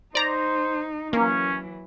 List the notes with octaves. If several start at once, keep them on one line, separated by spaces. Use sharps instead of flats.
D#4 C5 D5 A#5
E3 F#3 A#3 C#4